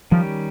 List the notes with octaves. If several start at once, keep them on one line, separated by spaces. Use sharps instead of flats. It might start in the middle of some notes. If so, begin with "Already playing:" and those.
D#3 F3 G3 C#4 G4